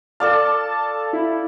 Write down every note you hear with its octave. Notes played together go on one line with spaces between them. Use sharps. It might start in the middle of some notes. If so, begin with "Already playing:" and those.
A4 D5 F5 A5
E4